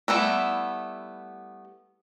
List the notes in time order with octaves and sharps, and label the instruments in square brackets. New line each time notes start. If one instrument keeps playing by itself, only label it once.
[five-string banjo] G3 A3 B3 E4